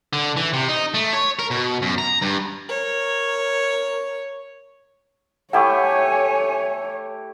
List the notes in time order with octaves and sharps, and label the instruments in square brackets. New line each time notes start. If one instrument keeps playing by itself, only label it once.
[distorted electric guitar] D3
E3
C3
D#4
A3
C#5
A#4
B2
F#2
A#5
G2
[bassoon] A#4 [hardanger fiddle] C#5
[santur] A3 E4 G4 [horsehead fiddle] C#5 [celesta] F#5 C#6 [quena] G#5